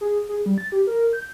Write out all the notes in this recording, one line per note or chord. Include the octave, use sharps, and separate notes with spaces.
G#4
G#4
G3
A6
G4
A#4
G6